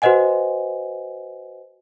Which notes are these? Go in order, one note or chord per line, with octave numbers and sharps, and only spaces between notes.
F#4 B4 C5 D#5 F#5 G#5